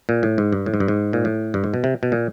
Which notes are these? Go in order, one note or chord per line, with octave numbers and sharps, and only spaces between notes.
A#2
A2
G#2
G2
A2
G#2
G2
G#2
A#2
A2
G2
G#2
B2
C3
B2
A#2